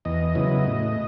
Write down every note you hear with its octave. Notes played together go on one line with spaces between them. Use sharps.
E2 D#5
C#3 F#3 B3 E4
A2